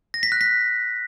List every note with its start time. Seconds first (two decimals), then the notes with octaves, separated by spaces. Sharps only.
0.14 A#6
0.23 B6
0.32 F#6
0.41 B6